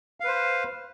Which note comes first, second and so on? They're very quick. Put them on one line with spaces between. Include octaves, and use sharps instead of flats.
F5 B4 C5